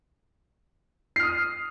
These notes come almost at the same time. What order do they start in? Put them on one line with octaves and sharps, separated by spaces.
C7 F6 D#6